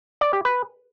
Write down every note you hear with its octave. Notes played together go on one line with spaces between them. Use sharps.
D5
G4
B4